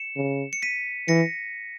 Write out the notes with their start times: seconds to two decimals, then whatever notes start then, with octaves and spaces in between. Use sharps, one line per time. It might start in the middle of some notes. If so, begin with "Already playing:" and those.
Already playing: C#7 E7
0.16 C#3
0.53 C#7
0.62 B6 D#7
1.08 E3 A#6 C#7